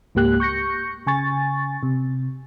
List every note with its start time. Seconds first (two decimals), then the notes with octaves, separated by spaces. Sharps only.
0.15 C#2 G#2 A#3 G4 F#6
0.40 C#6 G6 A#6 C#7
1.07 C#3 G#5 C#6 A6
1.83 C3